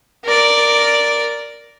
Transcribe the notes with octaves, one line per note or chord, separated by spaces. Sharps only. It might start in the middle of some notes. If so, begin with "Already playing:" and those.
A#4 D5